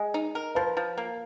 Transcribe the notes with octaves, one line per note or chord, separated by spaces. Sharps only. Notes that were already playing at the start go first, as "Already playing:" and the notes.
Already playing: G#3 G#4
D#4
A#4
F3 B4
F3
A#3